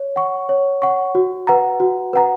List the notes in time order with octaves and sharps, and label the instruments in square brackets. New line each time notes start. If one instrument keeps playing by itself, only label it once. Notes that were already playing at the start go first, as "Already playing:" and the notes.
Already playing: [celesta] C#5
F#5 C#6
C#5
F#5 C#6
F#4
B4 F#5 A#5
F#4
B4 F#5 A#5